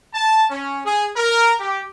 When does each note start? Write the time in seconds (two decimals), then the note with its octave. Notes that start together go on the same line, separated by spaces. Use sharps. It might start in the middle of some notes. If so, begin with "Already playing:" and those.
0.14 A5
0.50 C#4
0.84 G#4
1.16 A#4
1.60 G4